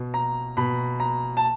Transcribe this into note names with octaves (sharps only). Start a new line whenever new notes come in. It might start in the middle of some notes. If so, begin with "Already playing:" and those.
Already playing: B2
A#5
B2 B5
A#5
A5